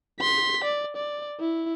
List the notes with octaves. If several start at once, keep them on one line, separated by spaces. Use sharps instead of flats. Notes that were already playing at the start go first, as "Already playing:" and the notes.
C6 B6
D5
D5
E4